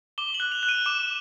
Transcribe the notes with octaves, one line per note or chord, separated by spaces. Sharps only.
D6 G7
F#7
F#6
F7
F#6
D#7
D6 E7